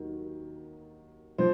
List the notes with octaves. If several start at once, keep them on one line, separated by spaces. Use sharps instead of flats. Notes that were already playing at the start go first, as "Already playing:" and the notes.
Already playing: D#2 D#3 F#3
F3 C5